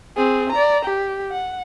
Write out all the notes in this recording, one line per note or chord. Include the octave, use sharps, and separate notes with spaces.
C4 G#4
D5 A#5
G4
F#5